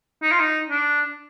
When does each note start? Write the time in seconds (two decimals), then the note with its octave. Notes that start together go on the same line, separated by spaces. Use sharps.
0.23 D#4
0.31 F4
0.40 D#4
0.69 D4